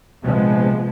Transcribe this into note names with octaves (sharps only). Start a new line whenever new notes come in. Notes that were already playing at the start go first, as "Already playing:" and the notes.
A#1 C3 F3 G#3 B3